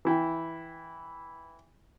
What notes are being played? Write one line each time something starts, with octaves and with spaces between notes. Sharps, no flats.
E3 E4 G5